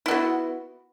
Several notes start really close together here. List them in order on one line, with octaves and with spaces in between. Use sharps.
E4 B3 F#4